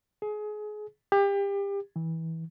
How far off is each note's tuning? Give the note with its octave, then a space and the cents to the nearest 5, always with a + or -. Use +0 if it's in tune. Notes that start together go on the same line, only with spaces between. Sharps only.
G#4 +25
G4 +30
E3 -20